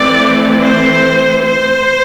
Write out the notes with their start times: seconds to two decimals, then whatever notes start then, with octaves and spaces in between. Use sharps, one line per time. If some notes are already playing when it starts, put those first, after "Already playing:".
Already playing: E3 A3 C4 D5
0.64 C5
1.45 C5